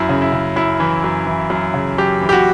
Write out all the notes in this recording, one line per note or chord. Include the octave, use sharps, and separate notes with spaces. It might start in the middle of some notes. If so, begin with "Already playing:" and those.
Already playing: F#2 E4
C#3
E4
C#3
F#2 E4
E3
F#2
E3
F#2
C#3
F#2 G4
E3
G4
F#4